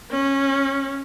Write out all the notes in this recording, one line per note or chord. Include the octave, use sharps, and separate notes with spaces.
C#4